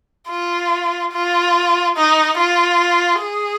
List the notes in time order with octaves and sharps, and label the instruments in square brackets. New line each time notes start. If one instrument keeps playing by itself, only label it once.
[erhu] F4
F4
D#4
F4
G#4